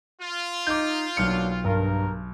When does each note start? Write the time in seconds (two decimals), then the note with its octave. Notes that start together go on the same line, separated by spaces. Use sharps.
0.21 F4
0.67 D#4 D6 G6
1.17 B1 F#3 A#3 D4 F6 C#7
1.65 G2 A#4